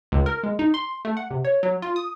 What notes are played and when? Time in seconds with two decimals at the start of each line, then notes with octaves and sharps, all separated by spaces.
0.12 C#2
0.26 A#4
0.43 G#3
0.59 D#4
0.74 C6
1.05 A3
1.17 F#5
1.30 C3
1.45 C#5
1.63 F#3
1.82 F4
1.96 D#6